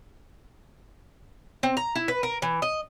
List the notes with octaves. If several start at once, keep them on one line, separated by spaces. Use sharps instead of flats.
C4
A#5
E4
B4
A#4
E3
D#5